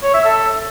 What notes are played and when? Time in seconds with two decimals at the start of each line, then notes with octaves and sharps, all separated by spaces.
0.03 C#5
0.14 E5
0.25 A4